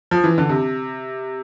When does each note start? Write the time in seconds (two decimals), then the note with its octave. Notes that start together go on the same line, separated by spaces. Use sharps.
0.11 F3
0.24 E3
0.38 D3
0.49 C3